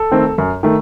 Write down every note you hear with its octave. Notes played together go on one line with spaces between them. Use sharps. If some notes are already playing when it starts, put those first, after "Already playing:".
Already playing: A4
D#3 A3 C4
F#2
D#3 A3